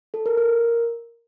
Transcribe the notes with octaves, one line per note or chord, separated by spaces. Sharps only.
A4
A#4
A#4